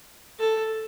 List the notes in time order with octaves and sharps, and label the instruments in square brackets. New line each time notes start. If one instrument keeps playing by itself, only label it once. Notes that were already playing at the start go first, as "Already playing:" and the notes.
[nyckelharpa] A4